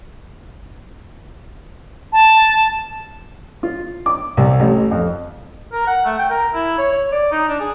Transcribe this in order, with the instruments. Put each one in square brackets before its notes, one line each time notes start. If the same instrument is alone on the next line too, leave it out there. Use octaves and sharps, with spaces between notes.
[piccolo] A5
[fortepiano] F4
D6
C2
A1
F2
[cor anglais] A#4
F#5
A3
G5
A#4
E4
C#5
C#5
D5
D#4
D4
G#4